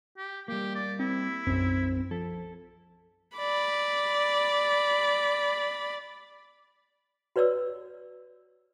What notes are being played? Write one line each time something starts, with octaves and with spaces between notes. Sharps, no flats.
G4
G3 A#3 G4
D5
C4 E4
B1 F#2 C4
F3 A4
D5 B5
F#4 B4 C#5 D5 E6